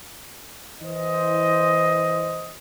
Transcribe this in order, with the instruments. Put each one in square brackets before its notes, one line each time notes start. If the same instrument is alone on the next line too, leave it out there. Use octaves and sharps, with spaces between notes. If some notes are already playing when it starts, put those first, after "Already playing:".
[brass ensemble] E3 C5 D#5